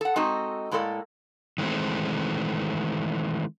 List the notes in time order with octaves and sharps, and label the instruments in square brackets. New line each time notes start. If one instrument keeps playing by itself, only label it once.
[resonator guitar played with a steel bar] A4 F#5
G#3 C4 D#4 F#4 A4
A2 G#3 A#3 A4 D5
[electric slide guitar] D#3 E3 G#3 A3 C4